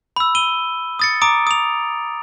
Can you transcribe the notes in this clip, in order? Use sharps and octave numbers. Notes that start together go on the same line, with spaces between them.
B5 E6
D#7 G7
D#6 A6 C#7
A#5 D6 D#6 D7
D#6 F7